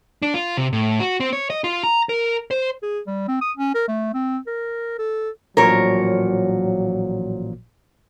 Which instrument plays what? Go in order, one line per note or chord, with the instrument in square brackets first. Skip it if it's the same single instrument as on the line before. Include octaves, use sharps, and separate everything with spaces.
[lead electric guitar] D4
F4
C3
A2
F#4
C4
C#5
D#5
F4
A#5
A#4
C5
[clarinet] G#4
G3
C4
D#6
C#4
A#4
A3
C4
A#4
A4
[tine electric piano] A1 A#2 F3 [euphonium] F#3 [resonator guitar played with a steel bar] A#4 C#5